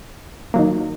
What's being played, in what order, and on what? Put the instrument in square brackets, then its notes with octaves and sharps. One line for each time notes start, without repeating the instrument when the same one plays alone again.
[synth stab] D#3 F#3 A#3